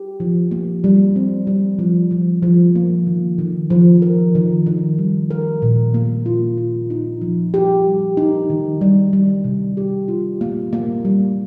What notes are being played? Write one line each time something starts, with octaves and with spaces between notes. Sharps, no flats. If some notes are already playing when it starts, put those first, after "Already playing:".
Already playing: G4
F3
A#3
G3
C4
G3
F3
F3
F3
A#3
D#3
D#3
F3
A#4
D#3
D#3
G3
A#4
A#2
A#3
F4
F4
D#4
F3
G4
G3
D#4
D#3
G3
G3
C3
G4
F4
A#3
A#3
G3